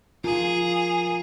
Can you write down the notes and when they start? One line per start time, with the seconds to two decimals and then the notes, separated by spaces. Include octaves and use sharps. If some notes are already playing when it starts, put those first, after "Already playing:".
0.24 F3 F4 G#4 A#4 A#5